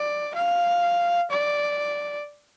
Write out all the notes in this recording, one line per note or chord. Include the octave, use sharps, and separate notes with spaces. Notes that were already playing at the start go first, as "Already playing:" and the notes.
Already playing: D5
F5
D5